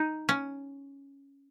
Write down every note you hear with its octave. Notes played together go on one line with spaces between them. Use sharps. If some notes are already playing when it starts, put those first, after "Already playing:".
Already playing: D#4
C#4